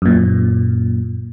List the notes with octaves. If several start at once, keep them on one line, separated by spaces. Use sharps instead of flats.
F#2 A#2